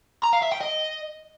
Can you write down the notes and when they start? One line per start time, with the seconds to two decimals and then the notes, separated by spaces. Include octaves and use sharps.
0.23 A#5
0.33 F5
0.42 E5
0.51 G5
0.61 D#5